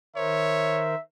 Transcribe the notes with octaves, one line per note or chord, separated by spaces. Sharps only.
D#3 A#4 C5 C#5 E5